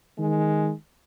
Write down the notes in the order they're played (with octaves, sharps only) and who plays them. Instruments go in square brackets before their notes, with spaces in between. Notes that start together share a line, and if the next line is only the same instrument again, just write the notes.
[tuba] D#3 [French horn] G#3